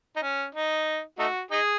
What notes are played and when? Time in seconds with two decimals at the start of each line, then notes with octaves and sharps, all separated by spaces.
0.16 D#4
0.22 C#4
0.55 D#4
1.19 A3 D#4 F#4
1.51 D#4 G#4